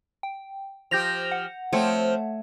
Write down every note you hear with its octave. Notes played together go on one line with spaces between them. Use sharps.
G5
F3 G4 G6 A#6 F7
F#5
F3 A3 C4 C#5